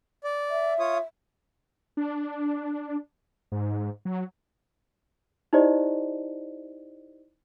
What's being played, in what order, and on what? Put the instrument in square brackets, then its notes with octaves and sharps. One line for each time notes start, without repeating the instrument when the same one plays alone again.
[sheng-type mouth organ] D5
[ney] E5
[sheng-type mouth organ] F4 C#5 D#6
[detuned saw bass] D4
G#2
F#3
[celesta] D#4 E4 G4 C5 D5 D#5